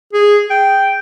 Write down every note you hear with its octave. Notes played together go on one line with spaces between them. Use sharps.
G#4
G5